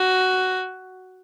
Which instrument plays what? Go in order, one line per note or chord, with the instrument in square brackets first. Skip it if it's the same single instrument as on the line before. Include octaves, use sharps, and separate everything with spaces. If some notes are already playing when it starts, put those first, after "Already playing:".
Already playing: [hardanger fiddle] F#4